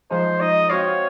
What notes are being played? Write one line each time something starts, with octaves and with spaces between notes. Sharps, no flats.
F3 G#3 D#4 C5
F3 G#3 D#4 D#5
C4 F#4 C5 C#5 F5